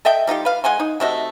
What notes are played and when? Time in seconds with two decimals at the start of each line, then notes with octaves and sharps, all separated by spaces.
0.05 A4 D#5 E5 G5
0.27 G3 D#4 F4 G4
0.45 B4 F5
0.64 G#3 F#5 G#5 C6
0.80 D#4
1.00 C3 A3 F#4 D#5